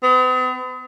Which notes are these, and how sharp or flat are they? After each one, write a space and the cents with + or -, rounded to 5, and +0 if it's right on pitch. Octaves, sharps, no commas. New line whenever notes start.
B3 +45